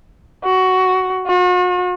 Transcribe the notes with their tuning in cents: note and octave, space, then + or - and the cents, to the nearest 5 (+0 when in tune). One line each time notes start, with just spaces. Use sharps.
F#4 +10
F#4 -45